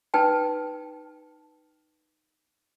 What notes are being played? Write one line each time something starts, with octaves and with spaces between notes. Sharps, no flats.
D#4 B4 G5 A5